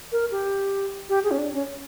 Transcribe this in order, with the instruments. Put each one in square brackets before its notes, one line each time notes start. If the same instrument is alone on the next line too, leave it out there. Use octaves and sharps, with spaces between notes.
[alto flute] A#4
G4
G4
G#4
C#4
D4
C#4